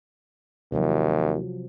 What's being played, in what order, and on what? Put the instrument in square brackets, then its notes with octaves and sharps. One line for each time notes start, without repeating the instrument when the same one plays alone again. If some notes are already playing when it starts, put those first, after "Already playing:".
[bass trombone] D#2 [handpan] C3 F3 F#3